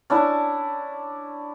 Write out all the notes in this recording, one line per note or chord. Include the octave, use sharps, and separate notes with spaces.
C#4 D4 E4 A5